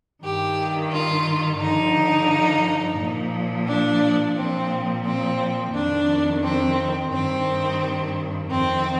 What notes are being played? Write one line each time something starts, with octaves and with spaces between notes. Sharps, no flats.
G2 D#3 G4
F4
G2 D3 F3 D#4
A#2 F3
D4
A#2 F3 C4
C4
F2 D#3 D4
C4
G2 D#3 C4
F2 D#3 C4